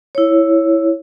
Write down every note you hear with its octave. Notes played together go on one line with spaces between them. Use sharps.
E4 C#5